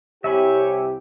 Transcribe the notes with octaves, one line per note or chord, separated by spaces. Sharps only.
C2 G4 C#5 E5 G#5 B5